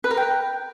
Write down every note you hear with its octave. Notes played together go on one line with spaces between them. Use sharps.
B4
A#4
G5